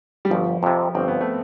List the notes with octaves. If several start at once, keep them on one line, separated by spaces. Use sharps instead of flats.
G3
G1 F3
F2 C3
G1 C4
B3
A3